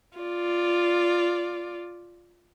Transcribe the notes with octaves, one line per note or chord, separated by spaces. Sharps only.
F4 D5